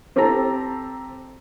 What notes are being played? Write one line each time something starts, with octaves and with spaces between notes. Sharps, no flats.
C4 G4 A4 A5 A#5